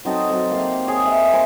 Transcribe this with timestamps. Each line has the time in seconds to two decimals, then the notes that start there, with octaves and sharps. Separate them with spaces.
0.05 F#3 C4 D#4 A4
0.29 F#3 C4 A4
0.51 A#3 G4 F5
0.87 G#4 C#5
1.04 C#5 E5
1.32 A#4 C5 G#5